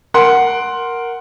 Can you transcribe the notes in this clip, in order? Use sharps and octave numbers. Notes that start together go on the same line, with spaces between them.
A#4 F#5 C6